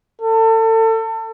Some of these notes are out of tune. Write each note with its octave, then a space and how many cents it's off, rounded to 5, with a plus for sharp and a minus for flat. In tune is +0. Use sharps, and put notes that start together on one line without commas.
A4 +30